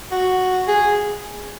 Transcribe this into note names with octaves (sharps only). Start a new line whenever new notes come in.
F#4
G#4